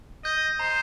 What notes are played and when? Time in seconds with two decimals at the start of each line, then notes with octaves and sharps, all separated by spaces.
0.24 D#5 G6
0.59 C5 A#5